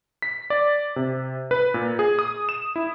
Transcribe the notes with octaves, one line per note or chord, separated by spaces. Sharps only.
B6
D5
C3
B4
A#2
G#4
D#6
E7
E4